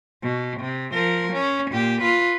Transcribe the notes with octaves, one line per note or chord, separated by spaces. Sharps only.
B2
C3
F3 A#4
C#4
A#2 G4
F4 B4